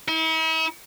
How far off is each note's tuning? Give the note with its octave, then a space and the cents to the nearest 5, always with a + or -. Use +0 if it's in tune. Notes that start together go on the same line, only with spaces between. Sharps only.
E4 -45